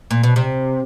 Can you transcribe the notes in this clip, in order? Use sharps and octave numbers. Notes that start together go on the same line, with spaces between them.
A#2
B2
C3